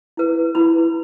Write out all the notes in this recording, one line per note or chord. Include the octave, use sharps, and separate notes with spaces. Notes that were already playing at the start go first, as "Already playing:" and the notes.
E4 B4
E4 B4 B5